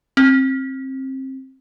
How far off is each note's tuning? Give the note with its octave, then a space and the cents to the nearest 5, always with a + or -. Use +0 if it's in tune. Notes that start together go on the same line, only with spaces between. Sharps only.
C4 +25